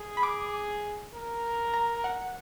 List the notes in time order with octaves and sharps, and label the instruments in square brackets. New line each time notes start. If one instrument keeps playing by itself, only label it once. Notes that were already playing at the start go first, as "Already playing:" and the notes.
Already playing: [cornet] G#4
[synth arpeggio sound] B5
D6
[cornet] A#4
[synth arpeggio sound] A#5
F#5